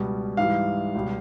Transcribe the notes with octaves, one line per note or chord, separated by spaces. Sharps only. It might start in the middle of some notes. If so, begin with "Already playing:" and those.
Already playing: C#2 B2 G3
G#2 E3 G3 F5
C#2 B2 G3